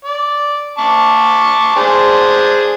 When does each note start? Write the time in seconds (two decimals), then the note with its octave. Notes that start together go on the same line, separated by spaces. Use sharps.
0.05 D5
0.78 A5 C#6 D6
1.76 D4 G#4 C5